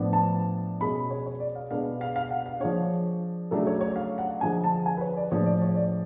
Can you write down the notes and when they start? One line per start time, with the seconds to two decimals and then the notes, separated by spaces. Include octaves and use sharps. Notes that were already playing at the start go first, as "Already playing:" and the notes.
Already playing: A2 F3 B3 D4
0.13 A5
0.81 B2 G#3 C#4 B5
1.10 C#5
1.26 C#5
1.40 D5
1.55 F5
1.71 B2 G#3 B3 D4 F5
2.01 F5
2.16 F5
2.31 F#5
2.46 F5
2.60 F3 G#3 D4 C#5
3.51 C#3 F#3 A3 D4 A4
3.67 C#5
3.81 C#5
3.96 F5
4.18 F#5
4.41 D3 F3 G#3 G#5
4.64 A5
4.86 G#5
4.97 B4
5.01 C#5
5.17 D5
5.31 A2 F3 G#3 D4 C#5
5.46 D5
5.62 C#5
5.76 D5